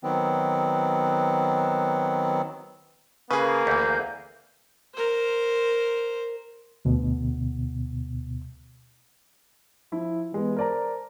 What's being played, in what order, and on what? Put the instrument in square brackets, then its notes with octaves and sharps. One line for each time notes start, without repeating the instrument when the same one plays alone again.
[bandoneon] D#3 F#3 B3 C4
[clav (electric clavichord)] C#3 [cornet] A#3 [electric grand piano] G#4 B4
[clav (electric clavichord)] D2 E3 [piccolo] G6
[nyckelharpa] A#4 C5
[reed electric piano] D2 B2
[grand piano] F3 E4
E3 G#3 B3
A#4 C5 D5 A5 A#5